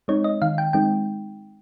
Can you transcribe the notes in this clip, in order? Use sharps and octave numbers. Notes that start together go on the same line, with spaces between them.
G#3 C4 D#4 C#5
D#5
D#3 F5
G5
G#3 C4 D#4 G5